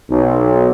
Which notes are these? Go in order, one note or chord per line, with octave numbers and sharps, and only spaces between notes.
B1